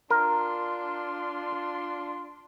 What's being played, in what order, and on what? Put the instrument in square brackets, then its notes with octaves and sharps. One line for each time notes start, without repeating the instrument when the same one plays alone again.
[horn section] D4 F4 C6 [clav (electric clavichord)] A#4